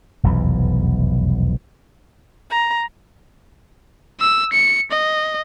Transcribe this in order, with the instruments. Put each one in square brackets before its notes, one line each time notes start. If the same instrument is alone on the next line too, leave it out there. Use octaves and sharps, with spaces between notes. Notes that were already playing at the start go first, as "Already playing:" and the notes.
[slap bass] F1 B1 E2 E3
[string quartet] A#5
[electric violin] E6
C#7
D#5